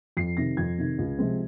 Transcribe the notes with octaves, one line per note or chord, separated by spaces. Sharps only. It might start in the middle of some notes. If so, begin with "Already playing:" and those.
F2 C7
C3 D#3 A#6
F2 G#6
C3 D#3
C#2
C3 F3 G#3 C4